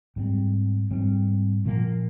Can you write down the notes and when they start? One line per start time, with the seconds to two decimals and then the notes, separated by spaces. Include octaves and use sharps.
0.16 G#2 G3 C4
0.91 G#2 G3 C4
1.65 A#2 F3 A#3